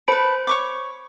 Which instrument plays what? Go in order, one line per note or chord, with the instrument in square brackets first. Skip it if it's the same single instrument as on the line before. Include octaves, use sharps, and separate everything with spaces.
[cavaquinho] A4 B4 [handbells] C5 B5 D7
[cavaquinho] C#5 C#6 D6